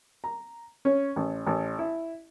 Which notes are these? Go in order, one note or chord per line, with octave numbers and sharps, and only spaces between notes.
A#5
C#4
A1
A1
E4